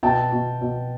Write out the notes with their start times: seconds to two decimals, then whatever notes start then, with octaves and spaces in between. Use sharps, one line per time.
0.03 B2 G5 A5
0.32 B2
0.61 B2